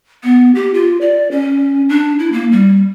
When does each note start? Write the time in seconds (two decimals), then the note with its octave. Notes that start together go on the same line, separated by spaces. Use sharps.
0.23 B3
0.55 G4
0.74 F4
1.01 D5
1.31 C#4
1.89 D4
2.19 E4
2.32 A#3
2.52 G3